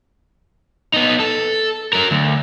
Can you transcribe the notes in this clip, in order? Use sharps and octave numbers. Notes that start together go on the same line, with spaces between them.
B3 D#4
A4
F#3 A#4
D2